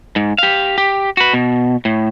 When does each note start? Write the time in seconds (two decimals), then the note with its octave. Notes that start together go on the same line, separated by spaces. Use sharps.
0.16 G#2
0.38 G4 F5
0.78 G4
1.17 F#4 B4
1.34 B2
1.85 A2